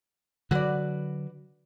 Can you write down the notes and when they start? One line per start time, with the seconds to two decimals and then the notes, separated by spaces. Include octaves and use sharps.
0.51 D3 F#3 F#4 B4 D5